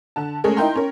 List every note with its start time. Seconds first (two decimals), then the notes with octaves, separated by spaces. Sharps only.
0.16 D3 A5
0.44 G#3 A3 C#4 G#4 A#4
0.57 D#4 E4 A#4 G5 A#5 C6
0.75 C#4 A#4